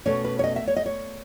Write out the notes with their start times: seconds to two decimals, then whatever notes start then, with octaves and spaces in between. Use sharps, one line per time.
0.06 B2 A3 C#4 C#5
0.25 B4
0.39 C#5
0.44 D#5
0.56 E5
0.68 C#5
0.76 D#5
0.86 C#5